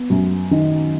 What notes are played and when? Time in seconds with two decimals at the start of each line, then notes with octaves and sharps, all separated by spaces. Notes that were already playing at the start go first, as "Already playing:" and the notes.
Already playing: B3
0.10 F#2
0.51 D#3